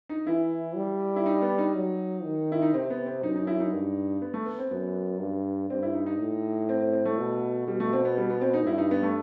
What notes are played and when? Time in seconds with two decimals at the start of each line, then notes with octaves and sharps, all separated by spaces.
0.09 D#4
0.27 E3 E4
0.76 G3
1.16 E4
1.26 D#4
1.42 B3
1.58 D#4
1.75 F#3
2.24 D#3
2.52 E4
2.62 D#4
2.73 C3 C4
2.90 B3
3.06 C4
3.23 F#2 D#4
3.36 D#4
3.47 E4
3.60 D#4
3.72 G2
4.22 B3
4.34 A3
4.46 B3
4.59 C4
4.71 F#2 B3
5.20 G2
5.70 G2 C4
5.83 E4
5.95 D#4
6.06 D#4
6.19 A2
6.69 C4
6.81 C4
6.93 C4
7.05 A3
7.18 B2
7.67 B2 G3
7.80 A3
7.93 C4
8.05 B3
8.17 G3
8.30 B3
8.41 C4
8.54 D#4
8.67 G2 E4
8.78 D#4
8.91 B3
9.03 A3